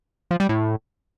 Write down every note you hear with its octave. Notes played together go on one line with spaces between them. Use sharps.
F3
G3
A2